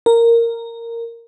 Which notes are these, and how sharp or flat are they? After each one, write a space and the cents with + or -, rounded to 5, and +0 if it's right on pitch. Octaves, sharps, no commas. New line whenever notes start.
A#4 -10